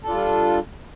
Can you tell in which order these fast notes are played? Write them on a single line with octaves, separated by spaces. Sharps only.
A4 D4 F4 G3